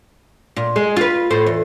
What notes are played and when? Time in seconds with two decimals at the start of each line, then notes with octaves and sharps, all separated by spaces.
0.56 A#2
0.76 G#3
0.97 F4 B4
1.31 A2 C5
1.46 E2